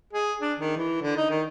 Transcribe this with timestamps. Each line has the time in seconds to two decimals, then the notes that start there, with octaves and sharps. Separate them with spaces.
0.13 G#4
0.41 D4
0.59 D#3
0.77 E3
1.02 D3
1.17 D#4
1.30 D#3